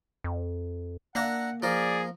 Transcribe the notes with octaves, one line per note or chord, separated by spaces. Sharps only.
F2
A#3 D4 E5 F#5 A#5
F3 G#4 A#4 D5